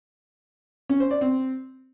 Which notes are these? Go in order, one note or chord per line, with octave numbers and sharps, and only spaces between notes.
C#4
C5
D5
C4